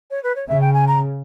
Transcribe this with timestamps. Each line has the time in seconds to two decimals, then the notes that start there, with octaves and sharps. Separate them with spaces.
0.11 C#5
0.23 B4
0.36 C#5
0.48 C#3 E5
0.61 G5
0.74 G#5
0.87 A#5